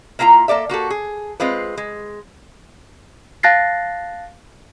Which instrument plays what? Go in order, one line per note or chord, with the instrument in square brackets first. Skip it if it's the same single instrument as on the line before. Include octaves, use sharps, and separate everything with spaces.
[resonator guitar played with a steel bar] A#3 E4 F4 G#5 A#5
A#3 A4 D5 E5
A#3 F#4 G4 A4
G#4
G#3 C4 F4 B4
G#3
[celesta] F5 A5 F#6 A6 A#6 C7